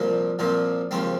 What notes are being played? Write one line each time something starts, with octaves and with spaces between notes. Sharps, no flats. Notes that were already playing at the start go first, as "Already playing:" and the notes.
Already playing: C2 A#2 F3 A#3
C2 A#2 F3 A#3
D#2 C#3 F3 G#3 C4